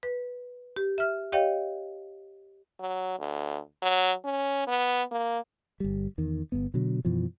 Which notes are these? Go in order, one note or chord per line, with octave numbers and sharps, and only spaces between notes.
B4
G4
E5 F6
G4 C#5 D#5 F5 G5
F#3
D2
F#3
C#4
B3
A#3
G1 G3
E2 D#3
G1 G2 B3
B2 D3 F#3
F#2 B2 E3 F3